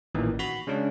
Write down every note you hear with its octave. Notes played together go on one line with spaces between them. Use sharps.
A1 A#2 D#3 E3
F#4 B5
C#3 G#3 C#4 D4